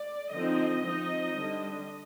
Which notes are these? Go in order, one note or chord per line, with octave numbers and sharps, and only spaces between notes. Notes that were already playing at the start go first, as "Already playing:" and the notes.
Already playing: D5
D3 F3 C4 D#4 D#5
F3 C4 D#4
D3 G3 D4